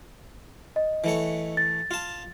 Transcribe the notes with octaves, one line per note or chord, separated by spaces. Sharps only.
D#5
E3 A3 C#5
A6
F4 A5